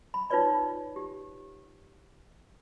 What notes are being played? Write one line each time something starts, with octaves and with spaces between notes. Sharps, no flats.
B5
D#4 F4 B4 C#5 D5 B5
G4